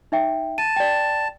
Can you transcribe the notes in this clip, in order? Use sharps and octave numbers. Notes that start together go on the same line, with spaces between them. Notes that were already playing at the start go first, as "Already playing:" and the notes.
D#4 E5 G5
A5 D#7
D5 G5